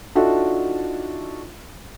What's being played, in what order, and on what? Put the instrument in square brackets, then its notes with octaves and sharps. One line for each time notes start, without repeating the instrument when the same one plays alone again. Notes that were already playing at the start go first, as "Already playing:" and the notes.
[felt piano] D4 D#4 F4 F#4 A4 E5